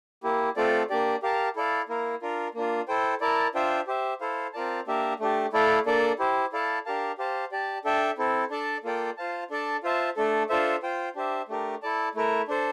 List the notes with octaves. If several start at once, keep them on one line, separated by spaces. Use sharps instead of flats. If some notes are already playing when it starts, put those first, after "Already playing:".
A#3 E4 G4
A3 C4 F4 A4 D5
A#3 D4 G4 D5
G4 A#4 F5 A5
E4 A4 D5 F5
A#3 E4 A#4 F5
D4 F4 A#4
A#3 D4 F4
E4 A4 C5 G5
E4 A#4 D5 A5
D4 F4 C5 E5 G5
G4 C5 E5
E4 A4 C5 F5
C4 F4 A#4 D5 A5
A#3 D4 G4 A#4 E5
A3 D4 G4
A3 E4 A4 D5 F5
A#3 D4 A4 D5
E4 G4 C5
E4 A4 D5 F5 A5
D4 G4 A#4 F5 A5
G4 C5 F5 A5
G4 D5 A5
D4 A4 E5 G5
C4 E4 A4
D4 A4 D5 A5
A#3 F4 A4 D5 G5
F4 C5 F5 A5
D4 A4 D5 A5
F4 C5 E5 A5
A3 D4 A4
D4 F4 A4 C5 E5
F4 C5 G5
D4 G4 C5 E5
A3 D4 G4 A#4
E4 A4 D5 A5
A3 E4 A#4 E5
D4 A4 C5